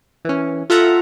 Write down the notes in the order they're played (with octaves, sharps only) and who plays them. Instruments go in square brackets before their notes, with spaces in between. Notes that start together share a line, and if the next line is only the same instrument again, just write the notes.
[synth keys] E3 C#4
F4 A4 E5 F#5 A#5